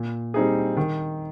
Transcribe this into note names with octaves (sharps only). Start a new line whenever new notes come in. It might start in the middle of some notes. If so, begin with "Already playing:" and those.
Already playing: A#2
G3 C4 D#4 G#4
D#3